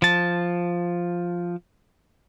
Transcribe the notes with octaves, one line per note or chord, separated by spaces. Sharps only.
F3 A5